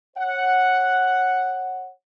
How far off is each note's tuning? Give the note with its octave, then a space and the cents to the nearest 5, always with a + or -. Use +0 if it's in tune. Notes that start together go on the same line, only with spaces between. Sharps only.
C#5 -25 F#5 +0